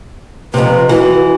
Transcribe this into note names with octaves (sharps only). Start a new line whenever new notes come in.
F2 C3 B4
E3 F#4